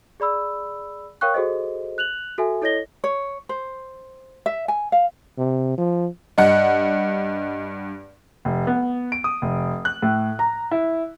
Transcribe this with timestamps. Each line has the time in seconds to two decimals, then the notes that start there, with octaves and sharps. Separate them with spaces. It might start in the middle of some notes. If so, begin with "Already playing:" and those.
0.20 G#4 D5 B5 E6
1.21 A#4 C#5 F5 G5 C#6 F#6
1.34 F#4 G#4 A4 C5 D#5
1.98 F#6 F7 F#7
2.38 F#4 A4 E5 G#5
2.62 E4 A4 C#5 D#5 A#6 G7
3.04 C#5
3.49 C5
4.46 E5
4.68 G#5
4.92 F5
5.38 C3
5.78 F3
6.38 G2 D#5 F#5
8.45 F1
8.67 B3
9.12 D7
9.24 D#6
9.42 F1
9.85 F#6
10.02 A2
10.39 A#5
10.71 E4